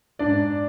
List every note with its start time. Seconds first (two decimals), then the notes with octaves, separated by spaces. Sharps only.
0.19 G#2 D4 D5